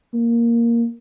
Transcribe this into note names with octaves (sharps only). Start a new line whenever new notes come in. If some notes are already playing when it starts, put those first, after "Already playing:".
A#3